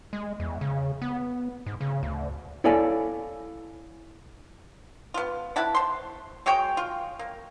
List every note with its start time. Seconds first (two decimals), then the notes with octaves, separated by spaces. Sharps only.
0.13 G#3
0.40 E2
0.61 C#3
1.02 B3
1.66 G#2
1.81 C#3
2.03 D2
2.64 E4 A4 C#5 D5 F5 G#5
5.14 B3 F4
5.56 E4 F#5 A5 B5
5.75 C5 C6
6.46 G#3 F#4 C#5 G5
6.77 F4
7.19 A#3